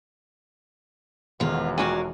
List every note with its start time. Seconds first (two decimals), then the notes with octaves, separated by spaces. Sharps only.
1.40 E1 A1 F#2 D#3 G#3 B3 F4 F6
1.78 G#3 F4 F#4 A#4 D5 G#5